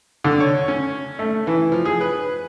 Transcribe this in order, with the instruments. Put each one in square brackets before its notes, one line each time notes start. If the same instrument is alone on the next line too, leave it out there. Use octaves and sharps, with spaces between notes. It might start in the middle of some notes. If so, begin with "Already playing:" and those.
[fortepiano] D3
C#5
C#4
A3
E3
F3
G#4
B4